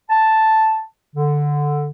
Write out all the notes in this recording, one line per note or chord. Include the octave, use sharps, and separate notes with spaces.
A5
D3